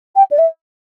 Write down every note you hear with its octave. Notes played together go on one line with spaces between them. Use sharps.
G5
D5
E5